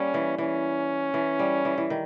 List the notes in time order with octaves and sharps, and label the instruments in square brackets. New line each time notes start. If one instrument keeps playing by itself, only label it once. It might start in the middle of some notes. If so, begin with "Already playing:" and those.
Already playing: [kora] G3 A#3 [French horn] C#4
[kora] E3
[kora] E3 [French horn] C#4
[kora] E3
G3
E3
E3
D#3